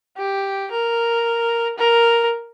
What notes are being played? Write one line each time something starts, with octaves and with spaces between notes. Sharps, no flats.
G4
A#4
A#4